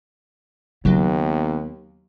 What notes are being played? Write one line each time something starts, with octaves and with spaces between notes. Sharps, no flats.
D#2 C#3 F#3 A#3 B3